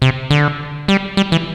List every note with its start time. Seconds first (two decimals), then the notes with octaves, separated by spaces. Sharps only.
0.02 C3
0.30 D3
0.88 G3
1.17 G3
1.32 E3